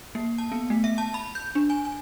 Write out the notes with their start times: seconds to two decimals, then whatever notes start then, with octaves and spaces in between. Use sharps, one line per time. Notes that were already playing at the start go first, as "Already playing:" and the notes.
0.15 A#3
0.38 A5
0.52 B3
0.70 A3
0.84 E5
0.98 A5
1.14 B5
1.35 G6
1.55 D4
1.70 G#5
1.85 G#5